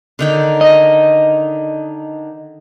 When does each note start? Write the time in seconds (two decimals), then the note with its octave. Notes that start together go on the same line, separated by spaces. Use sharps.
0.19 D3 D#3 G5
0.61 D#5